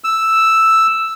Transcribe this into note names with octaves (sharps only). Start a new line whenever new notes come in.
E6